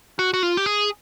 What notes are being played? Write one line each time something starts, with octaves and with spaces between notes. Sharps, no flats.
F#4
F#4
F4
G4
G#4